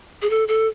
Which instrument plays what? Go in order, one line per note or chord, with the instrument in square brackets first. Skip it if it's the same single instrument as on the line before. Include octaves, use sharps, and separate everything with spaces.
[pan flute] G#4
A4
A4